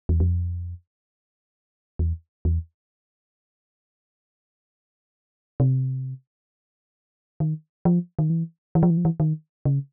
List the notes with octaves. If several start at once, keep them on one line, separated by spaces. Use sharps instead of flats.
E2
F2
E2
E2
C3
D#3
F3
D#3
E3
E3
F3
E3
F3
E3
D#3
C#3